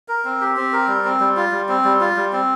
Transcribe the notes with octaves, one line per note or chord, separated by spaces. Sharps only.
A#4
C4
G4
C4
A#4
G3
C4
G3
F4
G3
C4
G3
F4
G3
C4